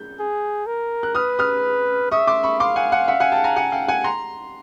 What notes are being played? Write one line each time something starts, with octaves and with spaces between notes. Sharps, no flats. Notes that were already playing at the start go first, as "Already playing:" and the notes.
Already playing: G6
G#4
A#4
F#6
B4 D#6 F6
D#6 F6
E5 C#6 D#6
C6 D6
B5 C#6
F5 C6 D6
F#5 G#5
F#5 G#5
E5 F#5
F#5 G#5
G5 A5
G#5 A#5
F#5 G#5
F5 G5
F#5 G#5
A#5 C6